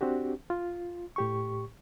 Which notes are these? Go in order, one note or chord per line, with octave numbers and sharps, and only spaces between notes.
C4 D4 F#4 G4
F4
A2 G4 C#6